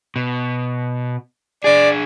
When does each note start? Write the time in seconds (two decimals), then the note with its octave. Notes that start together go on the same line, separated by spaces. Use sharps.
0.16 B2
1.64 D4 G#4 D5